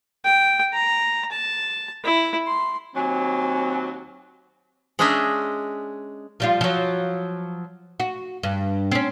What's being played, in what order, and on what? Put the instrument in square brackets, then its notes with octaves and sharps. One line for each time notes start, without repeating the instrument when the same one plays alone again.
[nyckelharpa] G5
A#5
A5
E4
C6
[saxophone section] D#2 F#3 [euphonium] C4 [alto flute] G#5
[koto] G#3 C#4 D4 G#4 D#5 E5
[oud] F3 G3 F4
F3 F#3
F#4
G2
C4 C#4